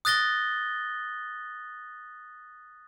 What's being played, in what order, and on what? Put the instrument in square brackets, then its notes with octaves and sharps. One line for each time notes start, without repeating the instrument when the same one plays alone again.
[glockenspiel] D#6 F#6 A6 A#6 G7